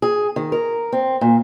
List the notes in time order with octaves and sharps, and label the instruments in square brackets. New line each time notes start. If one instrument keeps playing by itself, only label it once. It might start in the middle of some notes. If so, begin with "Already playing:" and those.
[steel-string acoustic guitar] G#4
D#3
A#4
C4
A#2